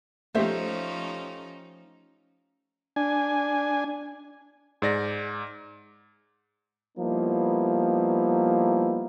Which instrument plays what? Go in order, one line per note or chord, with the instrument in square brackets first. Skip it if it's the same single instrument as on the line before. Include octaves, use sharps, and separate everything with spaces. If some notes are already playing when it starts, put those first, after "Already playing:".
[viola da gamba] F3 C#4 D#4 [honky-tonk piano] A3 G4 [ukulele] C5 E5
[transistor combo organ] D4 G#5
[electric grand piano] G#2 D5 A#6
[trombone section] F3 G3 A#3 B3 D#4 E4